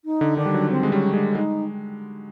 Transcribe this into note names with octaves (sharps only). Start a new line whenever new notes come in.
D#4
D3
D#3 D4
G3
F#3
C4
G#3
G3 C#4
G#3 D4
G#3 D#4